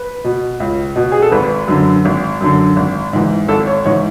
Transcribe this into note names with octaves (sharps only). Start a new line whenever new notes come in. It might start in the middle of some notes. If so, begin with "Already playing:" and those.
Already playing: B4
B2
C#2
B2
G#4
A4
G#1 B4
F#2 D3
G#1
F#2 D3
G#1
G#2 E3
G#1 A4
C#5
G#2 E3 C#5